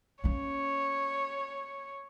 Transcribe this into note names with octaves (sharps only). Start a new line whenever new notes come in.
A#3 C#4 C#5